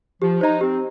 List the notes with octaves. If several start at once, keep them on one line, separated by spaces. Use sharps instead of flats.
F3 G4
D#4 C5 D#5 A#5
C4 G4